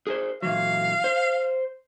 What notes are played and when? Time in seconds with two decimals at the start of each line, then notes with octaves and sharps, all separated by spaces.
0.07 G#4 A#4 C5
0.42 A#2 E3 F#3 F5
1.04 C5